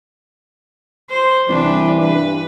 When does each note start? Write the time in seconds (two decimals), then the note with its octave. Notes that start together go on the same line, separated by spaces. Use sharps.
1.10 C5 C6
1.49 C2 E3 D4 B4
2.00 G2 B4